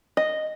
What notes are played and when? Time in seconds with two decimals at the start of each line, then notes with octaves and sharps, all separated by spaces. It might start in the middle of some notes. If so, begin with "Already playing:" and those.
0.17 D#5